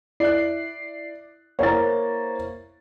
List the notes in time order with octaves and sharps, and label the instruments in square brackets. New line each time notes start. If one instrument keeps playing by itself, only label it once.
[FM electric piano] E4 C7 [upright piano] D5 F#6
[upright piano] A#3 [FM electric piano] E4 C5 [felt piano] C#5 A#5 A6